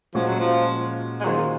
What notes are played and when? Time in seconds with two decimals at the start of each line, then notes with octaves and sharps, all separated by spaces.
0.15 A#2 F3 G#3 C#4 F#4
0.28 F#3
0.40 F3
1.20 G#3
1.25 D#3 F#3 A#3 F4 G#4 C5